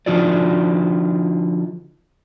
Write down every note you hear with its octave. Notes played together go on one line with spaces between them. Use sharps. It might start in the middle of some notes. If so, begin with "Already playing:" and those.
D3 F3 D#4 F4 F#4 D5